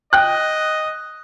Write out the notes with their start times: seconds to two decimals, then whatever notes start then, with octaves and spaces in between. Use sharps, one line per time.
0.13 D#5 G5 F#6